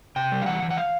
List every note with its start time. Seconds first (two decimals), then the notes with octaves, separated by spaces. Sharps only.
0.16 C3 G5
0.32 G3
0.42 F5
0.46 E3 F#5
0.62 E3
0.70 F#5
0.77 F5